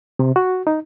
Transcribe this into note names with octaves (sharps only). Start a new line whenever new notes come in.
C3
F#4
D#4